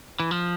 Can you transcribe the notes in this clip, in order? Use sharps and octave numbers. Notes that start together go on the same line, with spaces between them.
E3
F3